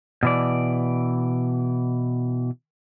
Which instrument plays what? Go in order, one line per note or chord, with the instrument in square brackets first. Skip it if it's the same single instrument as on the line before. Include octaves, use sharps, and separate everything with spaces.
[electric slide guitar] B2 E3 D5